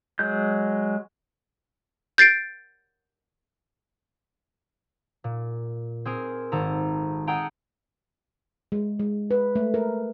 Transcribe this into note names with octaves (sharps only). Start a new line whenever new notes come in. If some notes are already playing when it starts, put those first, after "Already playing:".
F#3 G#3 G6
G6 A6 C7 D7
A#2
C4 G#4 A#4
G#1 A4 A#5
G#4 A4 D#5 F#5 G5 A#5
G#3
G#3
B4
A3
A#4